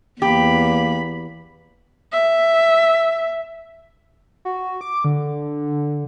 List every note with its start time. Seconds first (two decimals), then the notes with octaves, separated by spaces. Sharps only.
0.22 E2 A#3 G4 B5
2.12 E5
4.45 F#4
4.81 D6
5.04 D3